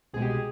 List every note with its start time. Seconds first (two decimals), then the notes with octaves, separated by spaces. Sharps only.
0.13 C2 B2 G#3 G#4
0.22 G4
0.29 G#4